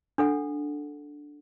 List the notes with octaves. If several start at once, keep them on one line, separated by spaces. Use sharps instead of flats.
D4 A4 F#5